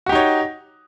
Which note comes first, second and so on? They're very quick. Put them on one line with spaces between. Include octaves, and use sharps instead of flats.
F#4 G4 D#4 C#5